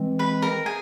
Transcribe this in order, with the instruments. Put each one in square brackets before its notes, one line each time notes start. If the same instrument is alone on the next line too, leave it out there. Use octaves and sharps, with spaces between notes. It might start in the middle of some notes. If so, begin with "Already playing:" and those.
Already playing: [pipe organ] E3 G#3 C4
[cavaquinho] B4 B5
A#4 A#5
G#4 G#5